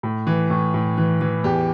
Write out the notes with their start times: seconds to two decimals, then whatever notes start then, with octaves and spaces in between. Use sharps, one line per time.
0.03 A2
0.27 E3
0.50 A2
0.74 A2
0.98 E3
1.21 E3
1.44 E2 G4